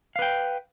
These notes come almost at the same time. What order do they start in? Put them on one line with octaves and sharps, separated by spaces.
F5 B4 G5